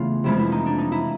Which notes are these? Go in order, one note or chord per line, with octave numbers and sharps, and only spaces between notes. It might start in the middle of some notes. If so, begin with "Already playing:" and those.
Already playing: E2 C#3 E3 A3 F4
F2 C3 E3 G#3 E4
E4
D#4
D4
D#4
E4